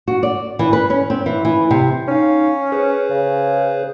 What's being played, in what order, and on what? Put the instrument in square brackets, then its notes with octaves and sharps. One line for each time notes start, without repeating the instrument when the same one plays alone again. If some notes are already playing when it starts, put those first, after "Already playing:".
[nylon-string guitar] F#4
D5
E3
B4
C#4
C4
E3
E3
C3
[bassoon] C#4 [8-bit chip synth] D#4 F5
[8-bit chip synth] G#4 B4 C5
[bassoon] C#3